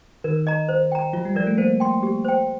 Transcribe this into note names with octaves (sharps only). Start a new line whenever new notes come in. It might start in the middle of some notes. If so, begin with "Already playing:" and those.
D#3 A#4
D#5 A#5
C5
G5 A#5
F3 F4
G3
F3 A#4 D5
A3
A#3 C5
G5 C6
G4
C5 G5